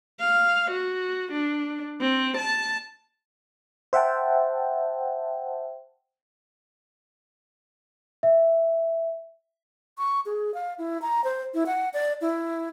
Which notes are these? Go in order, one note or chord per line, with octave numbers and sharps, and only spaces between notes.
F5
F#4
D4
C4
A5
C5 E5 F#5 G5 A5
E5
C#6
G#4
F5
E4
A#5
C5
E4
F#5
D5
E4